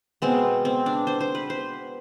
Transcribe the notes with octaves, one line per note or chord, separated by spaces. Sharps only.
B2 G#3 B3 C4
C4
D4
C5
C5
B4
C5